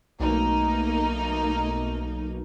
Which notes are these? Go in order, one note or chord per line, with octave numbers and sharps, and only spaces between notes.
B1 A3 A#3 D#4